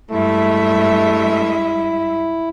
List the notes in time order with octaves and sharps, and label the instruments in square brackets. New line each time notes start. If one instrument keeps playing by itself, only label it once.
[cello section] G2 G#3 E5 [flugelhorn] A3 [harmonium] E4